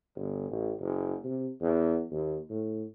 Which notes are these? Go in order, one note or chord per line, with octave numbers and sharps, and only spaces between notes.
G1
A1
F#1
C3
E2
D#2
A2